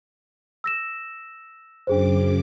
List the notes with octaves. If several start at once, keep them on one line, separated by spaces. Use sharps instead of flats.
E6 A#6 E7
F#2 C#3 D4 G#4 C5 D6